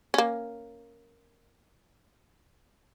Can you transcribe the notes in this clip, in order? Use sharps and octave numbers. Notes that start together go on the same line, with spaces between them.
A#3 C#4